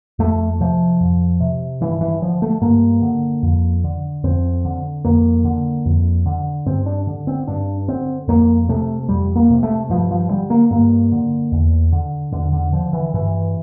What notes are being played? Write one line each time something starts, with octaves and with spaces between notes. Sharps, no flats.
F2 A3
C3 F3
F2
C3
G2 E3
E3
D3 F3
A3
G2 A#3
D3
F2
D3
F2 C4
D3
F2 A#3
D3
F2
D3
G2 C4
D4
D3
C4
G2 D4
D3 C4
F2 A#3
C3 A3
F2 G3
A#3
C3
A3
G2 F3
F3
D3 G3
A#3
G2 A#3
D3
E2
D3
E2 D3
D3
D3 F3
E3
G2 E3